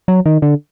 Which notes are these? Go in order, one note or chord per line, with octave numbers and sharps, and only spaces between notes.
F#3
D#3
D3